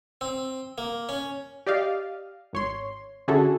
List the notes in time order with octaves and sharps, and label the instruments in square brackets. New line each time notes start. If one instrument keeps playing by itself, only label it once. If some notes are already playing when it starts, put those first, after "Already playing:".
[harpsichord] C4
A#3
C#4
[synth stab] G4 D5 D#5 F5
G#1 C#5 C6
D3 C#4 E4 F#4 G#4 A4